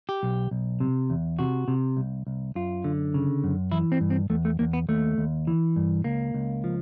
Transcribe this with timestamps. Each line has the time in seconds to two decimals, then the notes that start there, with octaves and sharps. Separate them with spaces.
0.09 G4
0.23 B1
0.51 B1
0.80 C3
1.10 E2
1.39 C3 F#4
1.68 C3
1.97 C2
2.27 C2
2.55 F#2 F4
2.84 D3
3.14 C#3
3.44 F#2
3.72 E3 E4
3.92 C4
4.01 G2
4.10 C4
4.30 E2 A3
4.45 A3
4.59 E2 A#3
4.73 B3
4.89 D#2 A3
5.18 D#2
5.47 E3
5.76 G2
6.04 C#2 A#3
6.34 C#2
6.64 F3